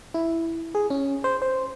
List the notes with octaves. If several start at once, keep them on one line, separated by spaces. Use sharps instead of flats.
E4
G#4
C#4
C5
C5